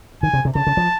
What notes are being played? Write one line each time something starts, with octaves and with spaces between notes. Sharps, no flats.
D#3 G#5
C3
C3
C#3 A5
C#3
F3